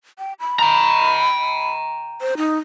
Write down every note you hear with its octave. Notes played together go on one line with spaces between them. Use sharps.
G5
B5
G5 A#5
C5
D#4